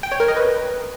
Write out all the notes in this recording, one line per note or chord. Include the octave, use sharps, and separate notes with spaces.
G5
C#5
A#4
D#5
B4